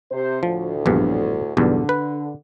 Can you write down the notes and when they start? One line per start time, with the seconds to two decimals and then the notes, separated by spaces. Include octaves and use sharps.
0.11 C3 C5
0.43 D2 A2 F3
0.86 A#1 E2 G2
1.57 B1 E2 G2 D3
1.89 B4